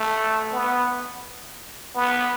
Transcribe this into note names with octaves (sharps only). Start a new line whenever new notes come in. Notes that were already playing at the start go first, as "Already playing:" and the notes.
Already playing: A3
B3
B3